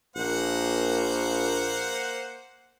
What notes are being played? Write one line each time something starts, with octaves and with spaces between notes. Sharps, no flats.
A#1 A#3 C5 F#5